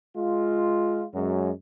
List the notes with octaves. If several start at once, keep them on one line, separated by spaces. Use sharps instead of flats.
G#3 F4
F#2 F#3 G#3